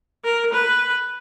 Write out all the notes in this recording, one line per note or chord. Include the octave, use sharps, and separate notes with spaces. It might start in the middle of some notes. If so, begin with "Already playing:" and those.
A#4
B4